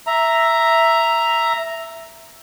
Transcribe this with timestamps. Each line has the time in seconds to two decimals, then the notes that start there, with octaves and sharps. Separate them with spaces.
0.07 E5 A#5